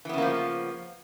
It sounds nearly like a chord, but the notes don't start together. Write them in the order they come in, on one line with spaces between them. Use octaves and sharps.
E3 B3 C#3 A#3 F3